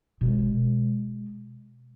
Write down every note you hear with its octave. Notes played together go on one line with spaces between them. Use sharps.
B2 G#3